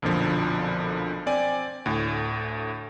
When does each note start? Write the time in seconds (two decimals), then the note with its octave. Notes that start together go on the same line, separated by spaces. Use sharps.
0.02 B1 F2 A#2 D3 F3
1.26 C4 D5 G#5
1.86 D2 A2